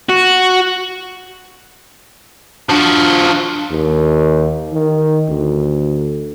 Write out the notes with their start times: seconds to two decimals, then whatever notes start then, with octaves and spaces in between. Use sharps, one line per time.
0.10 F#4
2.69 F3 D4 F#4
3.71 D#2
4.73 D#3
5.29 D2